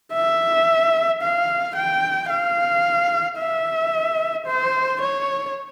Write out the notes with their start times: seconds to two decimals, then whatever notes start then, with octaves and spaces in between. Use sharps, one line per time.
0.14 E5
1.22 F5
1.76 G5
2.30 F5
3.38 E5
4.47 C5
5.01 C#5